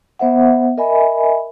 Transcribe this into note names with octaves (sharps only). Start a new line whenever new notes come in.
B3 C5 E5 F#5
A#4 D#5 E5 G#5 B5